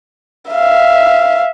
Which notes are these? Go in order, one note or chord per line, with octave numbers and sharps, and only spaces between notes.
E5 F5